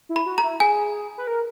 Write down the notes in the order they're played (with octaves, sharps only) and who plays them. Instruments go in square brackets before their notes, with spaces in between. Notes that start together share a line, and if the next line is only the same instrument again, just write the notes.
[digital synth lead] E4
[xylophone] B5
[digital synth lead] F#4
[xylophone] A#5
[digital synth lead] E4
[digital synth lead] G#4 [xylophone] G#5
[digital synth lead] B4
A#4